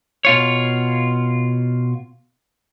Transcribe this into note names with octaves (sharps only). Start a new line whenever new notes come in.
B2 F4 C#5